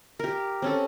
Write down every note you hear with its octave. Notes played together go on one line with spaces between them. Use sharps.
G4 A#4
C4 C#4 A4